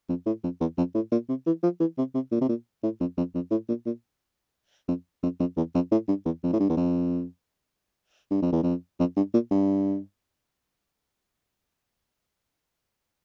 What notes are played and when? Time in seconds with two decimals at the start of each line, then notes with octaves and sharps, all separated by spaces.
0.09 F2
0.26 A2
0.44 F2
0.60 E2
0.78 F2
0.95 A2
1.12 A#2
1.29 C3
1.46 E3
1.63 F3
1.80 E3
1.98 C3
2.15 C3
2.32 A#2
2.41 C3
2.49 A#2
2.83 A2
3.00 F2
3.17 F2
3.35 F2
3.51 A2
3.69 A#2
3.86 A#2
4.89 F2
5.23 F2
5.40 F2
5.57 E2
5.75 F2
5.92 A2
6.08 G2
6.25 E2
6.43 F2
6.53 A2
6.60 G2
6.70 E2
6.77 F2
8.31 G2
8.42 F2
8.52 E2
8.63 F2
8.99 F2
9.17 G2
9.34 A#2
9.51 G2